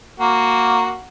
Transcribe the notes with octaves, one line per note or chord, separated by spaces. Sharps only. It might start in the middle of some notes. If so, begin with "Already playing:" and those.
A#3 F#4